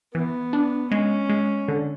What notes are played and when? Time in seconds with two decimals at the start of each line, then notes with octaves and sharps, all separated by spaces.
0.14 E3 B3
0.53 D4
0.91 G#3 C#4
1.29 G#3
1.68 D3